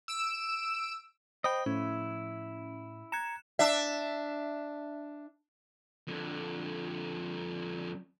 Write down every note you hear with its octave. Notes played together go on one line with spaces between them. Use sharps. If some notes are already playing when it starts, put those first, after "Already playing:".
E6 D7 E7
C5 D#5 G5 B5
A2 F3 C#4 E4
A#5 F#6 G#6 C#7 E7
D4 E5
F2 D3